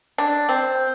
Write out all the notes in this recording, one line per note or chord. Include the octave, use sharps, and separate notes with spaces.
D4
C4